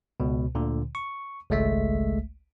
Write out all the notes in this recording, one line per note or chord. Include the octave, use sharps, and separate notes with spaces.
C#2 B2
D2 A#2 D3
C#6
G#1 C#2 G#3 A3 E5 B6